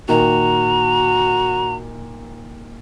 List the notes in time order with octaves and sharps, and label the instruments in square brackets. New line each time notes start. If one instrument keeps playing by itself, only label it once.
[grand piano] A#2 D#3 [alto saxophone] F#4 [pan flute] A#5